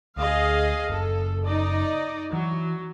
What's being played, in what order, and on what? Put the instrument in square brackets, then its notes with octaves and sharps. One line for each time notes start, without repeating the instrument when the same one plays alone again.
[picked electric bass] D2 [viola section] G#4 D#5 F5
[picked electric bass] F#1 [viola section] A4
[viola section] D#4 D5 D#5
[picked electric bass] E3 [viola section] F#3